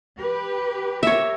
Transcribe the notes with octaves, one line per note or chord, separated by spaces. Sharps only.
G4 B4
G4 A#4 C#5 E5